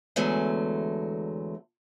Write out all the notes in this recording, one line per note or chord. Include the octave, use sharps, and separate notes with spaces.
E2 D3 F#3 G#3 A3